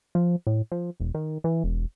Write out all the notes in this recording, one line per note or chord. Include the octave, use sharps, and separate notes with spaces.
F3
A2
F3
E1
D#3
E3
E1